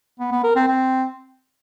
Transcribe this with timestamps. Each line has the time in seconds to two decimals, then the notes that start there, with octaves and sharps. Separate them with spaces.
0.20 B3
0.32 B3
0.44 A#4
0.56 C4
0.68 C4